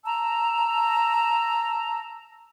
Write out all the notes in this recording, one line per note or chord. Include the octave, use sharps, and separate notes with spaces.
A5 A#5 E6